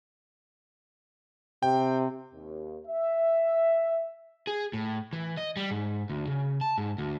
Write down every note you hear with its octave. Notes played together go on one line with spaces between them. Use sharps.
C3 G5
D#2
E5
G#4
A2
E3
D#5
G3
G#2
D2
C#3
A5
G#2
D2